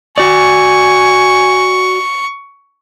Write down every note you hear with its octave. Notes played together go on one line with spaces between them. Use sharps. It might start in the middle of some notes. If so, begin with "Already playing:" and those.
F#4 D5 G#5 C#6